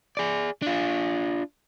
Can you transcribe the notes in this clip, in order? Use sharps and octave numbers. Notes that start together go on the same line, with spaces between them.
G#4 D5
D4 F4